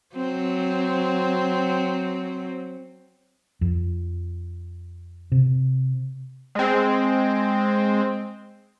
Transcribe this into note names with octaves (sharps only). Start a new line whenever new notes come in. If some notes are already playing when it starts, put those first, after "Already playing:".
F#3 C4
F2
C3
G#3 C4